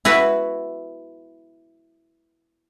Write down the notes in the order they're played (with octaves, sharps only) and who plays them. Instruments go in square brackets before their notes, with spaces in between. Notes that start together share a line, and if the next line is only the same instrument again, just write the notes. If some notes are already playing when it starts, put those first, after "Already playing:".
[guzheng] E4 F#4 B4